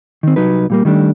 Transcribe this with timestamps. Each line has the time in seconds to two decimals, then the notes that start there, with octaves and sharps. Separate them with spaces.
0.23 D#3 C4
0.36 C2 F#3 D#4 B4
0.70 A#2 G3 A#3
0.85 D#3 G3 A3 D4